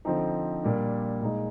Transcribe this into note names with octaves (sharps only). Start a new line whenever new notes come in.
D3 F3 C4 D#4
A#2 G3 A#3 D4
A#2 G#3 D#4